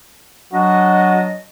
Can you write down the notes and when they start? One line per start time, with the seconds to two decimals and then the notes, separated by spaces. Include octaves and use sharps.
0.53 F#3 D4 F#4 D#5